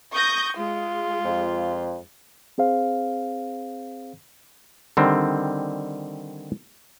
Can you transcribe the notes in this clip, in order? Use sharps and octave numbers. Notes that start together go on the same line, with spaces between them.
C#6 D#6 G6 A#6
G#3 F4
F2
C4 G#4 C5 F5
D3 D#3 G3 C4